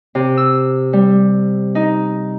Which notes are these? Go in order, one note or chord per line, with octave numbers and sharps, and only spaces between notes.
C3
E6
G3
D#4